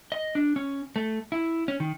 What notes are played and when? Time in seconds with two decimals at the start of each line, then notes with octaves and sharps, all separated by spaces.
0.12 D#5
0.35 D4
0.56 C#4
0.96 A3
1.32 E4
1.68 C#4
1.80 D#3